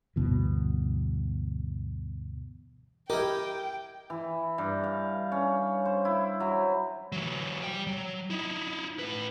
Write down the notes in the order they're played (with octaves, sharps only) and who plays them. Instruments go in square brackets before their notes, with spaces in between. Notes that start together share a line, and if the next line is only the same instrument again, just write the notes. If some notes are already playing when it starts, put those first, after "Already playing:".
[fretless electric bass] D2 G2 B2 E3
[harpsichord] E4 G4 [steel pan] A#4 [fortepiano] D#5 [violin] G5
[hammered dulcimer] E3
G2
F5
C#4
C5
E4
F#3
[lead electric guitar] E3 F#3
G3 G5
F#3
D#4 E4
A2 B4